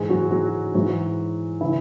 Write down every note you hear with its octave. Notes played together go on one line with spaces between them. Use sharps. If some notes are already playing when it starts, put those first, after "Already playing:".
Already playing: G#2 E3 G#3 G#4
F#3 F#4
F#3 F#4
G#2 E3 F#3 F#4
C#3 E3 E4